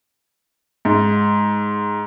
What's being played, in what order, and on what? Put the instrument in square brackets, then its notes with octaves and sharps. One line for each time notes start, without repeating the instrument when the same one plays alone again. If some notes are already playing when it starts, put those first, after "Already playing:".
[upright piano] G#2